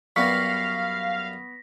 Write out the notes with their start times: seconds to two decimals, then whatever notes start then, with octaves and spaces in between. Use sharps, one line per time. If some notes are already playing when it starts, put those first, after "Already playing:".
0.16 F#2 G3 B3 F5 C#6 A#6 B6